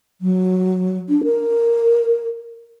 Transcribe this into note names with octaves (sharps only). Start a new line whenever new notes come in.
F#3
D4
A#4